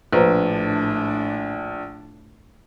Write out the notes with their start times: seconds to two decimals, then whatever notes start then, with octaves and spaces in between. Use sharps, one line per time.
0.13 A#1 A2 D4 B4 C5 A#5